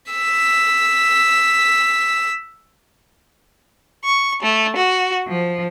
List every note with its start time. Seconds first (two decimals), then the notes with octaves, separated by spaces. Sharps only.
0.12 E6 B6
4.05 C#6
4.43 A3
4.76 F#4
5.28 F3